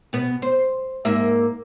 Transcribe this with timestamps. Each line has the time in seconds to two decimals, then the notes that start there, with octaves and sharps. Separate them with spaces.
0.13 B2 B3
0.42 C5
1.05 G#2 A#3 E5